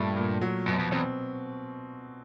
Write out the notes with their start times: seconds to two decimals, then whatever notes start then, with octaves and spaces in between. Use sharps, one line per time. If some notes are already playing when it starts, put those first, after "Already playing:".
Already playing: G2 A#2 A3
0.16 A#2
0.41 F#3
0.66 F#2 B2
0.79 F2
0.92 E2 C4